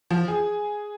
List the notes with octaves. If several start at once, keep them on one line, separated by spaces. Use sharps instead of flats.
F3
G#4